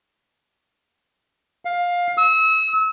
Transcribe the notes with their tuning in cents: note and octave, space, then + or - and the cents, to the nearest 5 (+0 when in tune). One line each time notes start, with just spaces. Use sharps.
F5 +15
E6 -35